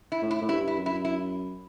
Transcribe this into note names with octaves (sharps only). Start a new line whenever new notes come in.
E4
A2
E4
A2
G2 E4
E4
F#2
E4
E4